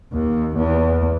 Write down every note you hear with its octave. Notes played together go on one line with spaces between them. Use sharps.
D#2
E2